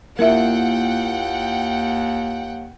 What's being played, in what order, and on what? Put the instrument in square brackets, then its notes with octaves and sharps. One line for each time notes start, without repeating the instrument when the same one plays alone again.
[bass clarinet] D#2 [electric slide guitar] A#3 E4 F4 [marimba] A#4 E5 [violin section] F#5 G5